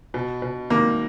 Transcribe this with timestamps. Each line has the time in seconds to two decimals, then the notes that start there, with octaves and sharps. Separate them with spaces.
0.14 B2
0.42 B2
0.70 D#3 A#3